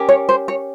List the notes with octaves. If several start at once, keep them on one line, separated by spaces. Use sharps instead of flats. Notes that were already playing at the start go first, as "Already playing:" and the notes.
Already playing: C#4 G4 A#4
C#5
C5
C#5